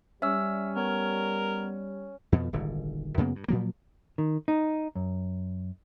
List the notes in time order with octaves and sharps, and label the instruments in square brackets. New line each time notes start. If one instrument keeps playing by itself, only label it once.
[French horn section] G3 [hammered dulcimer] C#4 [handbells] E5 E6
[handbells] B3 C#5 [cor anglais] A#4
[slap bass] F2 B2 F3
D#1 G#1 G#2 D3
F#2 C#3 A#3 B3
G2
A#2 F3 F#3 A#3
[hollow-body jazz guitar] D#3
D#4
F#2